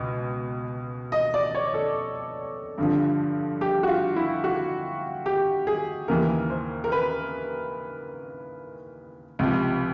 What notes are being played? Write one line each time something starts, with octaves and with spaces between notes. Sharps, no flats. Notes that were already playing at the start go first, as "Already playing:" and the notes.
Already playing: C#2 B2 D#5
D#5
D5
C#5
A4
G2 D3 F3
G4
F#4
F4
E4
F#4
G4
G#4
D#2 C#3 E3 A#4
C5
A#4
B4
C#2 C3 F3